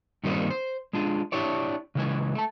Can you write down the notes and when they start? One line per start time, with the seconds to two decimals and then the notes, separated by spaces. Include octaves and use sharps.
0.24 G2 D#3 G3 A#3 C4 D#4
0.50 C5
0.93 G#3 D4 F4 G#4
1.32 D4 E4 G4 C#5 D5
1.95 C#3 E3 G#3 G#5
2.35 A3 A5